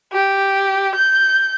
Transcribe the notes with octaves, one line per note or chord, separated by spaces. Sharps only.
G4
G6